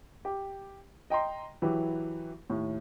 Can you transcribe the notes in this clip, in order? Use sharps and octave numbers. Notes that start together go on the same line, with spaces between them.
G4
D#5 G5 A#5 C6
E3 F#3 E4 G4 B4
D#2 A2